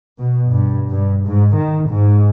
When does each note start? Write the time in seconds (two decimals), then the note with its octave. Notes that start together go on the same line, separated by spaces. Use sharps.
0.19 B2
0.50 G2
0.91 G2
1.26 G#2
1.57 D#3
1.91 G#2